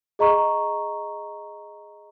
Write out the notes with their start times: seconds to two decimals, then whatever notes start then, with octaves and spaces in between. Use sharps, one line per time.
0.19 G#4 D#5 A#5 C#6